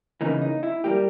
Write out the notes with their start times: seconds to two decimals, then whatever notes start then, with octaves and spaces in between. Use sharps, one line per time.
0.21 C#3 E3 A#3 D#4
0.41 D#4
0.63 E4
0.84 G3 A#3 G4